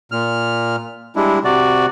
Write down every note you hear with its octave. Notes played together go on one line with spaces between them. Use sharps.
A#2 F6
G3 G#3 D4 E4
C3 F#4 D5